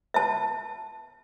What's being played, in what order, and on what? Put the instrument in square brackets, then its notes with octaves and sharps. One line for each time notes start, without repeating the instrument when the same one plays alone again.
[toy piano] E5 A5